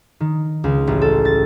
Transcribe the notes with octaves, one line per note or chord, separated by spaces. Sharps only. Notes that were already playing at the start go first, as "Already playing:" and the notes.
D#3
C#2
A1
A4
A6